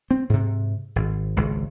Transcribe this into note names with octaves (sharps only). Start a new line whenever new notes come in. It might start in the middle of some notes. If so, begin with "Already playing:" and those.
C4
G#2 C3
G#1
G#1 C#2